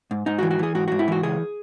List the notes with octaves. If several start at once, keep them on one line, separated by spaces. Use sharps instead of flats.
G#2
G#2 D#4
F#4
E3
F#4
E3 G#4
G#2 F#4
G#2 F#4
E4
E3 F#4
C#2 G#4